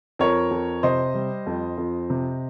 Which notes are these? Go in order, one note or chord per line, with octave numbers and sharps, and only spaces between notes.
F2 A#4 C#5
F2
C3 C5 D#5
G3
F2
F2
C3